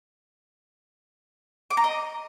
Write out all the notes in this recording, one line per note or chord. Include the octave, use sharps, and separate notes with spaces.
D6
A#5
D#5